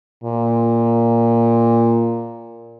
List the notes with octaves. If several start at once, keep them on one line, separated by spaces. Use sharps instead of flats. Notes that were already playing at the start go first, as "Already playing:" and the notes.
A#2